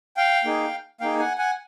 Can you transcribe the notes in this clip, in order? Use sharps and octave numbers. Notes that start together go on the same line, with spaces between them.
F5 G5
A#3 D#4 G#4
A#3 D#4 G#4 F5 G5
F#5 G#5
F#5 G#5